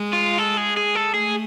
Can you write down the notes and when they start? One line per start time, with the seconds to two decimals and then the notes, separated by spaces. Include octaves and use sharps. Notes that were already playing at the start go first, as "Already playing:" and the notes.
Already playing: G#3
0.13 F4
0.38 A4
0.57 G#4
0.77 G#4
0.95 A4
1.14 A3 G#4